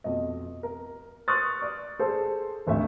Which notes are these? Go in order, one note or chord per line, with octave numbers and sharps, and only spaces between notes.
F2 B2 D#5
A#4
C6 C#6 D#6 F6 F#6 A6
D5
G#4 A4 C5
G#1 D2 A3 E5